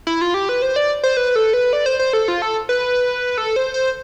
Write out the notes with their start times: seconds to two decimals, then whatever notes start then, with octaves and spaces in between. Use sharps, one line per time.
0.07 E4
0.21 F4
0.34 G4
0.49 B4
0.62 C5
0.76 D5
1.03 C5
1.17 B4
1.36 A4
1.53 B4
1.73 D5
1.86 C5
1.99 C5
2.13 A4
2.28 F4
2.42 A4
2.69 B4
3.38 A4
3.56 C5
3.74 C5